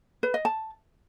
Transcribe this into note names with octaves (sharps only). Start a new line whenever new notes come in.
B4
D#5
A5